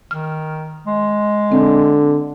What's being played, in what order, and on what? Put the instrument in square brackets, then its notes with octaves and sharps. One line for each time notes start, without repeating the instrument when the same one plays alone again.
[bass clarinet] D#3 [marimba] F6
[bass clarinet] G#3
[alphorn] D3 [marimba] C4